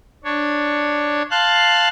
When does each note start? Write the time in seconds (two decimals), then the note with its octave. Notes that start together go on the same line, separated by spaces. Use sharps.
0.24 D4 C#5
1.31 F5 A5 C6 F#6